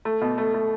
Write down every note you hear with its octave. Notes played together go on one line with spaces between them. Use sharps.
A3
B2
A3
A3